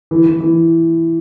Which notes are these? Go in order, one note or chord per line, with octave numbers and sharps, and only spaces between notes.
E3
E3
E3